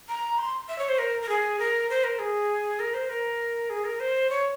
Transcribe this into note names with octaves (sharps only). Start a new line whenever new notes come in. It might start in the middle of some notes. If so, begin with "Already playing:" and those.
A#5
C6
E5
C#5
C5
A#4
A#4
G#4
A#4
C5
A#4
G#4
A#4
C5
A#4
G#4
A#4
C5
C#5